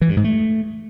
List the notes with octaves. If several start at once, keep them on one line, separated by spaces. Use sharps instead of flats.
E3
G2
G#2
A3